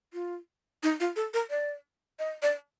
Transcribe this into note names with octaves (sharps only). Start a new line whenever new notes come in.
F4
D#4
F4
A4
A#4
D5
D#5
D5